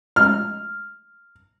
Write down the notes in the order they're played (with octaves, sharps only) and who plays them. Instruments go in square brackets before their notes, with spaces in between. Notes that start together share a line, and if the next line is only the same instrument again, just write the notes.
[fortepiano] F6